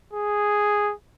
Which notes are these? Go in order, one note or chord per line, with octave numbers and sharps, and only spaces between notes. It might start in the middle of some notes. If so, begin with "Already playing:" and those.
G#4